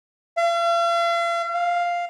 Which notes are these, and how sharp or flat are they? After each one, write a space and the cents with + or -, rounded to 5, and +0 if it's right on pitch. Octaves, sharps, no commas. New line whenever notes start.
F5 -45
F5 +0